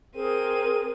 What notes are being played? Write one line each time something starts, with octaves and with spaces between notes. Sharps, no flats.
C4 G#4 A#4 D#7